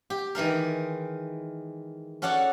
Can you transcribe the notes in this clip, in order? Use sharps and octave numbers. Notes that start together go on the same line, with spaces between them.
G4
D#3 E3 G#3 A#4
C#4 F#4 A4 D5 F#5 A5